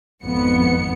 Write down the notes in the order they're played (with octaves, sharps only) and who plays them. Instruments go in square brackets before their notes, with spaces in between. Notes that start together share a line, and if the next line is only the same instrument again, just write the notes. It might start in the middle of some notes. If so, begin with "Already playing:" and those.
[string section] G#1 F2 B3 C#7